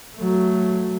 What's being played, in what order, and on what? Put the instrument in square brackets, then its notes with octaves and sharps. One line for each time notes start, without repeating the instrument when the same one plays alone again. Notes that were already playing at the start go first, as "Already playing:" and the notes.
[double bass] F#3 A3